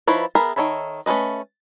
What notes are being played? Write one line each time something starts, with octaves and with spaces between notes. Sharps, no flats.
F3 D#4 E4 B4 C#5
B3 G#4 A#4 E5 B5
D#3 A4 C#5 E5 B5
A3 C#4 A4 B4 D#5